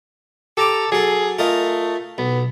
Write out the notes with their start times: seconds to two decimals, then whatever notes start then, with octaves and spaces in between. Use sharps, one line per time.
0.57 G4 A4 A#5 D6
0.92 F#3 G#4 A4
1.39 A3 F4 A#4 D#5
2.18 B1 B3